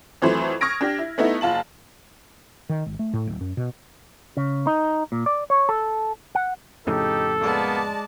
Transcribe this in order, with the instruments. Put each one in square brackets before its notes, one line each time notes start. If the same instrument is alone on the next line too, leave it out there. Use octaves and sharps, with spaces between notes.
[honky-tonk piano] F2 E3 F#3 A3 C5 B5
C#6 D#6 F6 G#6 A#6 D7
D4 G4
E4
A3 B3 D#4 E4
F#1 F4 A5 F#7
[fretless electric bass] D#3
G#1
A3
A2
D1
F#2
B2
[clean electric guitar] C#3
D#4
A#2
D5
C#5
A4
F#5
[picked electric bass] F2 A2 C#3 [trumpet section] D#4 G4 [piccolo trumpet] A4
[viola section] G#3 D5 A5 [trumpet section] A#3 B3